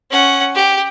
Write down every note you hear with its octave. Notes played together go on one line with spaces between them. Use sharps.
C#4 F#5
G4